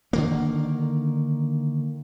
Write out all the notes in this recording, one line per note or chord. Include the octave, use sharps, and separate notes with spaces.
D3 D#3 A#3